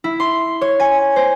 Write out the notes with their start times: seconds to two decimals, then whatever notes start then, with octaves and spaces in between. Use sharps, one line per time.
0.04 E4
0.20 C6
0.61 C#5
0.80 G#5
1.16 C5